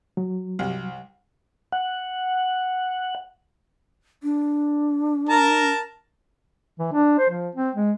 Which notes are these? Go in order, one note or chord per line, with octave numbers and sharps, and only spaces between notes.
F#3
C2
F#5
D4
A#4 A5 A#5
E3
D4
C5
F3
C4
G#3